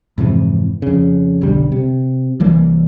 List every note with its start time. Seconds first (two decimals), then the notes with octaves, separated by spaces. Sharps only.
0.18 F2 G#2 C3 E3
0.82 F2 C#3
1.41 F1 B1 D3 G3
1.72 C3
2.40 C2 E3 G3 A#3